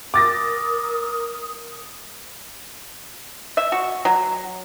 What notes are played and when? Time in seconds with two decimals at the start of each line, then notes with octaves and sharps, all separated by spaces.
0.14 A#4 D6 D#6 A6 A#6
3.57 E5
3.72 F#4
4.05 F#3